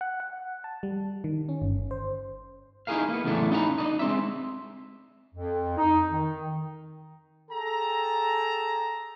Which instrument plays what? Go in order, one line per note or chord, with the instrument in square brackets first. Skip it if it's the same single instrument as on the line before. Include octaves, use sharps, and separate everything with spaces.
[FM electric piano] F#5
F#5
A5
G3
D#3
C#4
G1
C5
[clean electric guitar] D#4 E4 G4 G#4 A#4 F5
A#3 B3
E2 A2 C#3 F#3 A3 D4
C#4 D#4 F#4 G5 A#5 B5
D4 D#4 D#5
G#3 C4 E5
[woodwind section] F2
D#4
D#3
[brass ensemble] G#4 A4 G5 A5 A#5